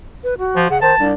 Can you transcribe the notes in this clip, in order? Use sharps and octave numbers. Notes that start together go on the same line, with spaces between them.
B4
F#4
F3
C#3 F#5
D#3 C5 A5
C2 D4